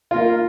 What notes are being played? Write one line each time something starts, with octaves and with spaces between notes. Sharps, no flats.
A#3 F4 A#4